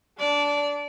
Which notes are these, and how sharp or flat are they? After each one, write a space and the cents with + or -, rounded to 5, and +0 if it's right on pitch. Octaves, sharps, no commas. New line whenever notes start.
D4 -15 D5 -20